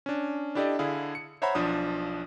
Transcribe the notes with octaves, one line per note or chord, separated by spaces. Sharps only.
C#4 D4
D4 E4 G4 A4 D5 D#5
D3 E4 G#4 F5
C#7
C5 C#5 E5 F#5 A#5 B5
B1 F3 D4 D#6